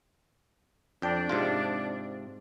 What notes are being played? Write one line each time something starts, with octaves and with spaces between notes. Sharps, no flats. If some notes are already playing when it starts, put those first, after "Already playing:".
F2 D4 G5
G#2 C3 F4